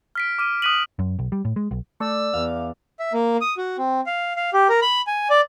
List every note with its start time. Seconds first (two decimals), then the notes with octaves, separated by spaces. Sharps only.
0.15 F6 B6 D7
0.39 D6 F6 D#7
0.62 D#6 F#6 B6 D#7 F#7
0.99 F#2
1.19 B1
1.32 G3
1.45 A2
1.56 G#3
1.71 B1
2.00 A3 D5 E6
2.34 E2 F5
2.99 E5
3.13 A#3
3.41 D#6
3.58 F#4
3.78 C4
4.06 F5
4.36 F5
4.53 G4
4.69 A#4
4.82 B5
5.07 G#5
5.30 D5